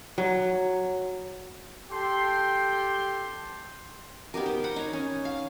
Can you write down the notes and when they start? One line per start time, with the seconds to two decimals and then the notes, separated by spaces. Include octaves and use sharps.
0.18 F#3
1.90 G4 A4 G5 C6
4.34 B3 D#4 G4 A#4
4.46 C5
4.64 C5 F#5 B5
4.76 D#4 C#5
4.93 C#4
5.25 F5